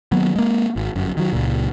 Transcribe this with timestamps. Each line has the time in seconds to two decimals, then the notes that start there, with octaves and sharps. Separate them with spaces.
0.12 D#3 F#3 A#3 B3
0.36 G#3 A#3
0.76 G#1
0.96 G1 F#2
1.17 D#3 F#3
1.33 C#2 A#2